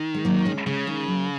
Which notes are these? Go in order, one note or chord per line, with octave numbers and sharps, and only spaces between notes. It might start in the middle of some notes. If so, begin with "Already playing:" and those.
Already playing: D#3
G#3
F#3 A#3
G#3 C#4
C#3 G#3 C#4
D#3 G#3
F#3 A#3